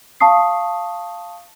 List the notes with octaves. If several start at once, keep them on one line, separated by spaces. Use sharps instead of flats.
F5 A5 C#6 D#6 C7